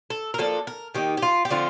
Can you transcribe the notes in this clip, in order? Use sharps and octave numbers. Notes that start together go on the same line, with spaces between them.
A4
A#4
F3 A#3 D4 A4
A#4
D#3 A#3 D#4 G4
G4
F4
G4
D3 F3 A3 C4 F4